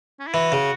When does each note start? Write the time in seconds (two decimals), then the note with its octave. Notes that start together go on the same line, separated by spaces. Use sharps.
0.20 C#4
0.27 E4
0.34 E3 F#4
0.52 C#3